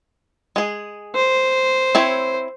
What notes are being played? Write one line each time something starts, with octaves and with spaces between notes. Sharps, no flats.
G#3 G#4
C5
C4 E4 C#5